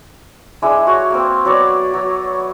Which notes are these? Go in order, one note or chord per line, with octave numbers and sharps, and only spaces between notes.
G#3 D4 E4
F#4 C#5
A#3 C4
F#3 B3 C#5 D5
F#3